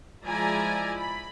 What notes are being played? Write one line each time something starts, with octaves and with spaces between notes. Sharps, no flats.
F3 G#3 E4 D5 G#5 A#5
B5